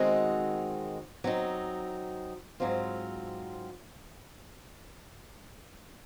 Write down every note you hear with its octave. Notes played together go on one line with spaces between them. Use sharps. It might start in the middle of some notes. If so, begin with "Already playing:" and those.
Already playing: D#3 G#3 C4 D#4 F#4
F#3 C4 D#4
G#2 F#3 C4 F4